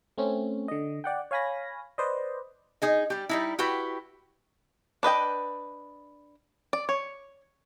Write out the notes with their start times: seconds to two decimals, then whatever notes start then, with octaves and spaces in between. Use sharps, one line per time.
0.18 A3 C4 C#4
0.68 D3 D#5
1.04 D5 F#5 G5
1.31 C#5 F5 G#5 B5 A#6
1.98 B4 C5 D5 D#5
2.82 D#4 G#4 D#5
3.10 G3 G4
3.29 G3 D#4 E4
3.59 E4 F#4 G4 B4 G5
5.03 D4 B4 D#5 G5
6.73 D5
6.89 C#5